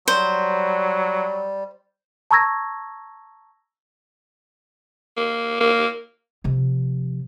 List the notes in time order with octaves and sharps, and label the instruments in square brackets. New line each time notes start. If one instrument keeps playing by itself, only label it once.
[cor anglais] F#3 [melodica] G3 [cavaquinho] C5
[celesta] A5 A#5 C#6 E6 G#6 A#6
[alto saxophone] A#3
A#3
[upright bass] C3 F3